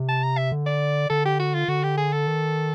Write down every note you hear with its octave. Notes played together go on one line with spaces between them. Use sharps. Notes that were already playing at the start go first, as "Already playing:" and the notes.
Already playing: C3
A5
A#5
E5
D3
D5
D3 A4
G4
F#4
F4
D3 F#4
G4
G#4
A4
D#3